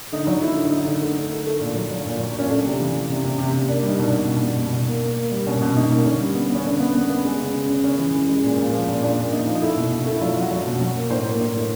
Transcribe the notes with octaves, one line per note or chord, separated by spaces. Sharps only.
D3 D#4
F#3
D3 E4
D3
D3 D#4
D3
A3
D3
A3
A3
A#2
F#3
F#3
A#2
F#3
A#2 C#4
A3 D4
C3
E3
E3
C3
C3
C3
C3
A#3 D4
G3
D#4
B2
D4
B2
B2
B2
B2
B2
A#3
A#3
A#3
G3
B2 C#4
B2
B2 D#4
A#3
D3 C#4
G3
B3
B3 C#4
D3 D4
B3
B3
B3
G#3
C#3
C#3
C#3
C#3 C#4
E3
E3
G#3
A#2
A#2
F3
A#2
A#2 D4
A#2
A#2 D#4
F3
D#4
A3 E4
B2
B2
A3
E4
F#3 F4
F#3 F#4
F#3
F#4
B2
F#3
A#3
A2 C5
A#3
A2
A2